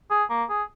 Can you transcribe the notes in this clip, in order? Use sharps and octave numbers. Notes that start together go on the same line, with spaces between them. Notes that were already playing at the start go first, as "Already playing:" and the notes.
G#4
A#3
G#4